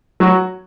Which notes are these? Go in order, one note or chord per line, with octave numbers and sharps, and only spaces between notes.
F#3 F#4